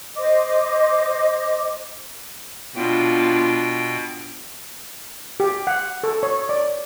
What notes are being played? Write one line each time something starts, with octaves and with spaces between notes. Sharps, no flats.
C5 D#5 D6
B2 B3 D4 F4 G5
G4
F#5
A4
C#5
D5